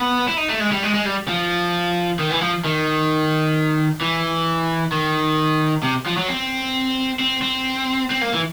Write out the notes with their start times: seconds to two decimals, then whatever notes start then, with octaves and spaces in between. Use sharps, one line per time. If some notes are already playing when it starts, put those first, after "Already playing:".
Already playing: B3
0.28 E4
0.37 D#4
0.49 A3
0.60 G#3
0.72 G3
0.83 G#3
0.94 G#3
1.05 G3
1.28 F3
2.19 D#3
2.30 E3
2.41 F3
2.64 D#3
4.01 E3
4.92 D#3
5.83 C3
6.06 F3
6.17 F#3
6.28 C4
7.19 C4
7.41 C4
8.10 C4
8.21 A#3
8.33 E3